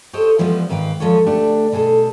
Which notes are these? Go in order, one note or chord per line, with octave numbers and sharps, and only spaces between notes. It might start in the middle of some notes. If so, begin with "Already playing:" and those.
G4 A4 C5 C#5 D#5
E3 F3 G3 G#3 B3
G#2 D#3 B4 F5 G5
E2 F3 G#3 A4 C#5
D2 A3 D4 G4
B2 G3 G#4 A4